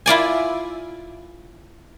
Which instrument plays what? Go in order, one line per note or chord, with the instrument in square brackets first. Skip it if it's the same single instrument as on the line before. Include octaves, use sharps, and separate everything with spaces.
[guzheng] E4 F4 D5 G#5